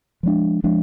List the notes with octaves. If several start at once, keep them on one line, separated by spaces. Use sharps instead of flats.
F3 G#3 D4
F3 G#3 D4